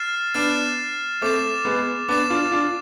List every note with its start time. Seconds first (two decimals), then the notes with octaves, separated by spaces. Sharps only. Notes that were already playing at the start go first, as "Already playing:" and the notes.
Already playing: F6 A6 C7 E7
0.34 B3 D4 F6 A6 C7 E7
1.22 A3 C4 D6 A6 E7
1.65 G#3 B3
2.09 B3 D4 D6 A6 E7
2.30 D4 F4
2.52 D4 F4